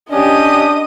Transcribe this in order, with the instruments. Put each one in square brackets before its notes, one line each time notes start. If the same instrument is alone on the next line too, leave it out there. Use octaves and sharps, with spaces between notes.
[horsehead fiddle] C#4 G4 [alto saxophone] D4 [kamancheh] D#5 D#6